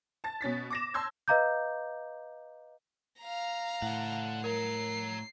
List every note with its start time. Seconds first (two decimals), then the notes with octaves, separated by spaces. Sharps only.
0.24 A5 A6
0.41 B2 C#4 A6 B6
0.70 D6 A#6 E7
0.94 A5 C6 E6 G6 G#6
1.28 B4 D#5 F5 A#5 D6 G6
3.21 F5 A#5
3.82 A2 A4 F#5
4.44 A#4 C#5 A#5 C7